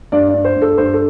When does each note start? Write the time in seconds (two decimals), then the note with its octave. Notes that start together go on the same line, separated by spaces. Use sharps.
0.12 G2 D5
0.29 G2 D5
0.44 C5
0.56 G2
0.62 A4
0.77 G2 C5
0.94 A4